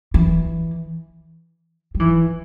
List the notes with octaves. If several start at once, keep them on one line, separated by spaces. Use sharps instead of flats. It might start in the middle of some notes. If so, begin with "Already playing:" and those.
E3
G3
E3